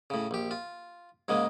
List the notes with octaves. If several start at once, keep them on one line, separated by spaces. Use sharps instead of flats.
A2 C#3
A#1 G4
F4
G#2 C#3 G#3 A#3